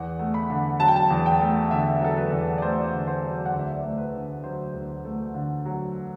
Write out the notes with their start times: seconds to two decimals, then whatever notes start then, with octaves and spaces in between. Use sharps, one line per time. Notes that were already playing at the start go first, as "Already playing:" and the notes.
Already playing: E2 F#5
0.19 A3
0.34 B5
0.50 D3
0.80 F#3 A5
0.88 G5
0.96 A5
1.10 E2
1.26 G5
1.41 A3
1.71 D3 E5
2.01 F#3 A4
2.17 B4
2.31 E2
2.58 D5
2.61 A3 C5
2.92 D3
3.07 C5
3.22 F#3
3.46 F#5
3.53 D2
3.59 E5
3.72 D5
3.83 A3 C5
3.98 B4
4.13 D3
4.44 F#3 C5
4.74 D2
5.05 A3
5.34 D3
5.65 F#3